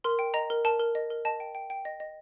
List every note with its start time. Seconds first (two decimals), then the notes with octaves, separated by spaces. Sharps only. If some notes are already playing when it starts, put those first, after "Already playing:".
0.04 A#4 C6
0.19 G5
0.34 D#5 A#5
0.50 A#4
0.65 A#4 A5
0.79 A#4
0.95 D#5
1.10 A#4
1.25 D#5 A5
1.40 G5
1.55 G5
1.70 G5
1.85 D#5
2.00 D#5